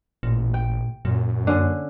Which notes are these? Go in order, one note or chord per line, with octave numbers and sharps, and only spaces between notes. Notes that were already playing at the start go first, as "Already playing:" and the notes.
A1 A#2
G5
F#2 A#2
D3 A#3 C#4